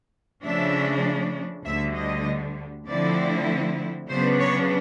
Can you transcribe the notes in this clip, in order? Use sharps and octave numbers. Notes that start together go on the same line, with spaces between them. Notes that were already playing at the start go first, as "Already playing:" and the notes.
C#3 F3 A3 D4 E5
D2 D3 G3 E5
D#5
D3 F3 A3 C4 E4 D5
C#3 F#3 B3 D4 C5
C#5